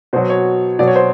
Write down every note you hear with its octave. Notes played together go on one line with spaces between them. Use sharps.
B2 F#3 C5
C#5
B2 F#3 D5
C#5
C5